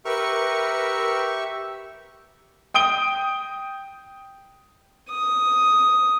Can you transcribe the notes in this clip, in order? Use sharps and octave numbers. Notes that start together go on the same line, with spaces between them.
G4 A#4 B4 E5 C#6 C#7
G5 D#6 D7 G7
D#6